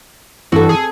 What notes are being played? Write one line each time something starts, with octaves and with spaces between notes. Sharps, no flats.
G2 E3 C4 F#4 A4
G#4